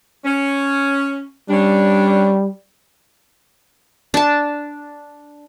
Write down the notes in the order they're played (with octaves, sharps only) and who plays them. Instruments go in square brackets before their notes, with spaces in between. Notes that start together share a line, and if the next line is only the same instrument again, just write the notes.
[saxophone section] C#4
[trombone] G3 [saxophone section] C#4 D4
[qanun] D4 A5